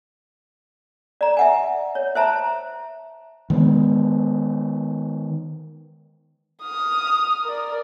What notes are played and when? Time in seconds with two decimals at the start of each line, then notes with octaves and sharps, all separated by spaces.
1.21 D5 A#5
1.37 E5 F#5 G#5
1.95 C#5
2.15 C5 E5 A5 A#5
3.50 D#3 G#3 B3
6.63 D#6 F6
7.43 A#4 D5